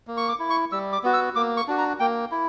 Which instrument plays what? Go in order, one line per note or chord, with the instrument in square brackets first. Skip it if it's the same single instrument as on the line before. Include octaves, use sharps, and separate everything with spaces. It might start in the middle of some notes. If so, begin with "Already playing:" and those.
[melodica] A#3
C#6
D6
E4
C#6
G3 E6
D6
B3 F#4
E6
A#3 D6
C#6
D4 F#4
A#5
A#3 G5
E4